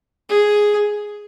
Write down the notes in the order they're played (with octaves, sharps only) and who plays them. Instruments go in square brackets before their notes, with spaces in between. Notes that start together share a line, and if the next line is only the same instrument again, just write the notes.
[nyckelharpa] G#4